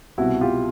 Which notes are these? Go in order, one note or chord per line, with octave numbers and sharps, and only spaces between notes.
C2 B2 E4 F#4
F4 G4